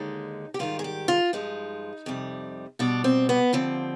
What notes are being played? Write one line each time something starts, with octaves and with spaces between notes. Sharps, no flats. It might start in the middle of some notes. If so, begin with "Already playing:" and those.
Already playing: D#2 D3 G#3 D#4
G4
G#2 D#3 G3 F4
G#4
G4
F4
G2 F3 G#3 D#4
F2 C3 G3
B2 G3 D4
C4
B3
D#2 D3 F3 C4